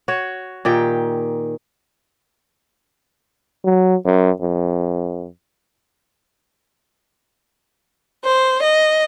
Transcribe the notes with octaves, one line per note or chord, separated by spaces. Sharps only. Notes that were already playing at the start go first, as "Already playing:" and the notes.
F#4 C#5
A#2 D#3 G4 G5
F#3
F#2
F2
C5
D#5